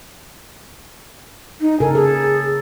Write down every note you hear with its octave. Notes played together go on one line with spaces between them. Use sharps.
D#4
C#3 A4 A#4 G#5
G#4 A4